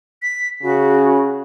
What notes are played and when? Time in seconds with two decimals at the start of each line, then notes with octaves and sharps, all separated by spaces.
0.22 B6
0.63 C#3 F#4